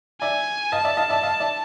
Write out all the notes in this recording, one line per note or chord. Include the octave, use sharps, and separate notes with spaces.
D5 E5 G#5
D#5 F5 A5
D5 E5
D#5 F5
D5 E5
D#5 F5
D5 E5